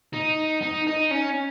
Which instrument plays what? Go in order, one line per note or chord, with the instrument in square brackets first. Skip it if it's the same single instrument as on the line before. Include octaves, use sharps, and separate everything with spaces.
[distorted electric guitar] D#4
D#4
D#4
C#4